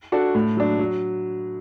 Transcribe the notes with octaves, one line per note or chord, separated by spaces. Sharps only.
D4 F#4 A4
A2
F#3 D4
F#3